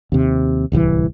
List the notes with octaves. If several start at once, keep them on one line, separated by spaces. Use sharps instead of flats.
D#2 C3
D1 C2 B2 E3